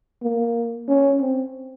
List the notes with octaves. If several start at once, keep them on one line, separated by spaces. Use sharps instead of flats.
A#3
C#4
C4